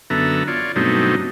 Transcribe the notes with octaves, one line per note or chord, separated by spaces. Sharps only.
F#2 D3 B3 A4 E5 A#5
F4 C#5 D5
G2 B2 F#3 A3 C4 D#4